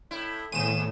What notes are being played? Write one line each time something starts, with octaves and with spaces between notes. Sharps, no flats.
A2 E4
D#2 A2 D#7 E7